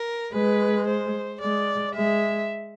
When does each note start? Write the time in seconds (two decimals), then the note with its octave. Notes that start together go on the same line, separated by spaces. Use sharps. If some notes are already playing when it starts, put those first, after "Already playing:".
Already playing: A#4
0.34 G#3 B4
0.87 C5
1.41 G#3 D5
1.95 G#3 E5